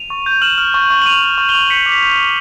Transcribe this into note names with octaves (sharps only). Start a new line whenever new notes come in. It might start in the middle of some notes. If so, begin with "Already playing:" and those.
Already playing: D#7 F7
C#6
G6
F6 E7 F#7
F6
C#6
C#6
F#7
C#6 D#7 F7
C#6
C#6
F7 G7
C#6
G6 B6 C#7
D6
B6 C#7
G6
B6 C#7
D6